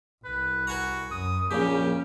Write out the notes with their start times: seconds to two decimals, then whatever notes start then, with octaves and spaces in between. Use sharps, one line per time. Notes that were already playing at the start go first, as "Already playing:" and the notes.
0.25 C2 B4
0.67 F#4 B4 G#5 A#5
1.11 F#2 D#6
1.51 A#1 A#2 C#3 A#3 C#4 G4